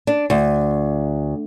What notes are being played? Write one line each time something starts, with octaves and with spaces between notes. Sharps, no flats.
D4
D2